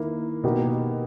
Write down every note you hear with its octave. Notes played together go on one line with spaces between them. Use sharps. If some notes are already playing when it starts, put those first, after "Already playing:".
Already playing: D#3 A#3 E4
B2 A#3 D#4 G4 A#4